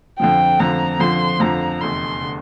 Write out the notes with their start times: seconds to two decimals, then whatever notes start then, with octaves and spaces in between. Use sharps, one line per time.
0.19 F2 D3 F3 G5
0.60 F2 D3 F3 A#5
1.00 F2 D3 F3 C6
1.40 F2 D3 F3 A#5
1.80 F1 E2 D3 C6
2.22 D3